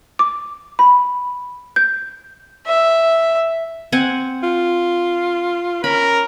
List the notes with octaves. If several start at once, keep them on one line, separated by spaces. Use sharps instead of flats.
D6
B5
G6
E5
C4 F#5 G#5
F4
C#4 A#4 B5